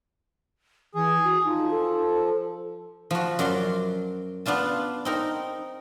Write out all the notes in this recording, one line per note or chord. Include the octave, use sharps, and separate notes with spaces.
E3 G#4
F#4
F3 D#4
A4
F3 F#4
F#2 F#4 D5 C6
B3 D4 F4 A5
C4 D#4 A#4